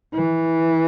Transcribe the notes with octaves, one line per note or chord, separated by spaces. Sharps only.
E3